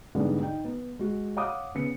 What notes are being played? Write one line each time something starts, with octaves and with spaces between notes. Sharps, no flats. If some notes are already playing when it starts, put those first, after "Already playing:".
G#2 D3 E3 G3 B3 D4
D#4 G5
B3
G#3 F#4
C#5 F5 F#5 D6 D#6
C#3 B3 C#7